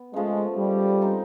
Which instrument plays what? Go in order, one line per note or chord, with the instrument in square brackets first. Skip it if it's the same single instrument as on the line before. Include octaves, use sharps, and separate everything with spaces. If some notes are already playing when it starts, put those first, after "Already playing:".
Already playing: [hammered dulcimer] B3
[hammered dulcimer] C#3 F3 A3 [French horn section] G#3
[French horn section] G3
[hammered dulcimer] G#3 C4 D#4 G4